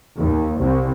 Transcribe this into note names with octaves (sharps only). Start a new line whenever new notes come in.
D#2
C2